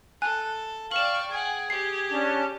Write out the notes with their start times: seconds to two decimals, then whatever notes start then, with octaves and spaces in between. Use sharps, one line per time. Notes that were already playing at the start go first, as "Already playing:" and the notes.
0.22 A4 G#5 F#6
0.91 D5 F5 G5 C#6 E7 F#7
1.31 G#4 F#5 G#5
1.70 G4 C7
2.10 C#4 D4 A5